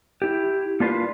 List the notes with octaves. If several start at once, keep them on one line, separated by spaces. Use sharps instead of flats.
E4 G4
A#3 D4 F4 B4 F5